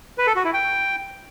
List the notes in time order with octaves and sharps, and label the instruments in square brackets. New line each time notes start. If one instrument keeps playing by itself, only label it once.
[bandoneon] B4
A4
F#4
E4
G5